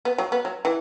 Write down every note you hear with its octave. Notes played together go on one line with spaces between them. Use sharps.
B3
F#3
B3
F#3
E3